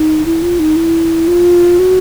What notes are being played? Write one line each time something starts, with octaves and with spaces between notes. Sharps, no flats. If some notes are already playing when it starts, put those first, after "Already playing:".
Already playing: D#4
E4
F4
D#4
E4
F4
F#4